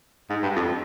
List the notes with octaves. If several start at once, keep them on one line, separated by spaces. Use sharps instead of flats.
G#2
G2
F2